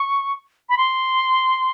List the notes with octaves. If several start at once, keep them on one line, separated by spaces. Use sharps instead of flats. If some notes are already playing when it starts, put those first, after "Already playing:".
Already playing: C#6
B5
C6